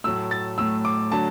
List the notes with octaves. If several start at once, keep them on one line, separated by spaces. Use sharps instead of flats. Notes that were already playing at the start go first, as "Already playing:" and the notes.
A2 F#3 A3 E6
A6
A2 F#3 A3 E6
D6
D3 F#3 A3 A5